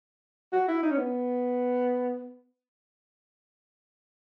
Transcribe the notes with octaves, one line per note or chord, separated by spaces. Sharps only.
F#4
E4
D#4
C#4
B3